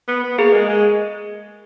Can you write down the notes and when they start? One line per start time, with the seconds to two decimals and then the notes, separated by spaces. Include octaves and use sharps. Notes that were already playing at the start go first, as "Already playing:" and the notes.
0.08 B3
0.24 B3
0.38 A#3 G#4
0.53 G#3
0.69 G#3